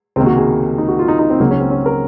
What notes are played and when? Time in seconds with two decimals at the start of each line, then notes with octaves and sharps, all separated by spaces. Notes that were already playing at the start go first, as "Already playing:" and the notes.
0.16 C#2 C3 D#3 A#3 C4
0.26 F#4
0.37 G#4
0.78 D#4
0.88 F#4
0.99 F4
1.08 D#4
1.19 D#4
1.30 C4
1.40 C#2 C#3 F#3 A#3
1.51 C#4
1.60 C4
1.71 C#4
1.86 A#4